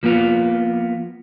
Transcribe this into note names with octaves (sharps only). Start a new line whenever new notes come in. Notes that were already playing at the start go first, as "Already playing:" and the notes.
F3 A#3 B3 F4